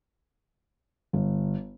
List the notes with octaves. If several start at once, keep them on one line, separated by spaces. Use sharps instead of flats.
G1